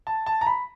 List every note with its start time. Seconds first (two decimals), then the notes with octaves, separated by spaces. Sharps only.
0.07 A5
0.26 A5
0.41 A#5
0.47 B5